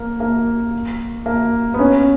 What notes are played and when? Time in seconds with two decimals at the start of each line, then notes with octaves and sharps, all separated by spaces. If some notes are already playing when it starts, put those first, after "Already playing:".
Already playing: A#3
0.20 A#3
1.26 A#3
1.74 B3
1.79 C#4